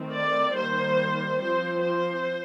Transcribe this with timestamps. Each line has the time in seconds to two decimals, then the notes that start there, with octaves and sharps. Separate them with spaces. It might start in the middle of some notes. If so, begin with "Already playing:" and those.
Already playing: D#3 A3 C4
0.12 D5
0.55 D#3 G3 A#3 C5
1.41 F3 C4 C5
1.83 C5